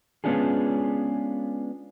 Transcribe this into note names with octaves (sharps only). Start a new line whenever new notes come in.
G#3 B3 C#4 D4 F4 G#4